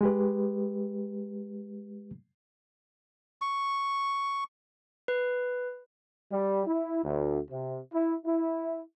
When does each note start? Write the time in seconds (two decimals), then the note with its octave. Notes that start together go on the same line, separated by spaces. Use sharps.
0.01 G#3 G4 B4
3.42 C#6
5.08 B4
6.31 G3
6.67 E4
7.04 D2
7.51 C3
7.92 E4
8.25 E4